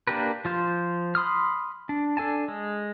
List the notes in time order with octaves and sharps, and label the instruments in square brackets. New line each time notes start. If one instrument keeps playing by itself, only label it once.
[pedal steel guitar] A#3 D4 G4 A#4 B4
F3 F4 C5
B5 C6 D#6 F6
D4
D4 A4 G#5 A5
G#3